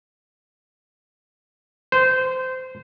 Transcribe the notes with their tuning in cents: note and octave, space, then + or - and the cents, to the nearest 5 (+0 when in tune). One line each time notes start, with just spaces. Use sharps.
C5 -20